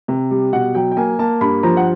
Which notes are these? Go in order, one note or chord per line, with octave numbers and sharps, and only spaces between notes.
C3
G3
B2 F#5
F#3 G5
G5
A#3 G#5
A#3 A5
G2 B5
F3 A#5
F#5